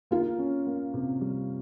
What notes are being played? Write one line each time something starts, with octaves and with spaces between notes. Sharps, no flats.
A#3 F4
C#4
A#3
C3
G3